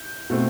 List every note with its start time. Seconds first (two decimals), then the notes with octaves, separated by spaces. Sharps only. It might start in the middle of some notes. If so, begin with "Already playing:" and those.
Already playing: G6
0.30 B2 A3 C4